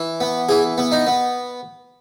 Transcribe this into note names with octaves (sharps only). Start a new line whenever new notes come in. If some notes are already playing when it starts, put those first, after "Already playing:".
Already playing: E3
B3
E3 G#4
B3
D#4
B3